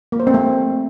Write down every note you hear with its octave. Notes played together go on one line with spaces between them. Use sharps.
A#3
C5
C4
A3